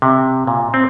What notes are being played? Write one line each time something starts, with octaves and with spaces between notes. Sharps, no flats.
C3
A#2
C4